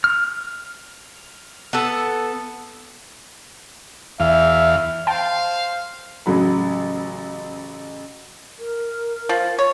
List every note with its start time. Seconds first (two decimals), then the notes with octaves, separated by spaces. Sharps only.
0.04 F6
1.73 B3 A4
4.20 E2 E5 F5
5.07 C5 F5 G5 A5
6.26 A1 C#3 F#3 B5
8.59 A#4
9.29 F3
9.59 C#5